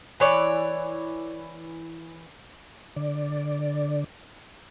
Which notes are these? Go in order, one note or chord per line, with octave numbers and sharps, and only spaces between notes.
E3 C#5 D5
D3 D5